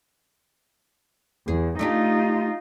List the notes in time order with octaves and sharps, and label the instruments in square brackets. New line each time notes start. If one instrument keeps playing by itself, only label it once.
[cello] E2 [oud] G#4
[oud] A3 D4 G4 [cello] D#4 F4